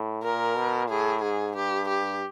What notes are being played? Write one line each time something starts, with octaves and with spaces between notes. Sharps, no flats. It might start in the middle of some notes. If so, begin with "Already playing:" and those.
Already playing: A2
A#2 A#4
B2
A2 G#4
G#2 G#4
G2 G4
G4